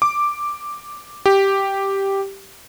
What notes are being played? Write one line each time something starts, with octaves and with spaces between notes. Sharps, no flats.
D6
G4